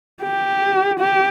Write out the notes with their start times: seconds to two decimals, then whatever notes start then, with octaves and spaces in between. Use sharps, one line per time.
0.23 G4
1.00 G4